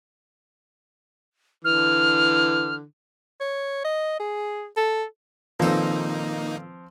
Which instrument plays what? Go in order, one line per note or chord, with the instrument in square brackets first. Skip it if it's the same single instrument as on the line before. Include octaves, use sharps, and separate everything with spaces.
[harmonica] D3 E3 [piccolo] F6
[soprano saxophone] C#5
D#5
G#4
A4
[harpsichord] A#2 A4 [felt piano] D#3 B4 [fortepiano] F3 C4 [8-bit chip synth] A#3 D#4